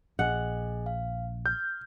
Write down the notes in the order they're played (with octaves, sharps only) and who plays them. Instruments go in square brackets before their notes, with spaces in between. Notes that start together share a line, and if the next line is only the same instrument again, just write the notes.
[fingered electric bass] A#1 [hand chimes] G#4 D#5 G#5 [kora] F#5
[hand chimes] F5
[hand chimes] F6 [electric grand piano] G6